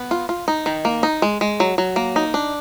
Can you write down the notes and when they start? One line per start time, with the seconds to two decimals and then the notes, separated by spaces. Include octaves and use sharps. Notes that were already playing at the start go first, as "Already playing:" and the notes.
Already playing: B3
0.11 F4
0.29 F4
0.48 D#4
0.66 D#3
0.85 A#3
1.03 D#4
1.22 G#3
1.41 G#3
1.60 F#3
1.78 F#3
1.96 A#3
2.16 D#4
2.34 D4